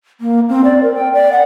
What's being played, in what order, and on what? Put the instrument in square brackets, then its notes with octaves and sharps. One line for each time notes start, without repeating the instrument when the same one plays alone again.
[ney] A#3
C4
D5
A#4
G5
D5
F#5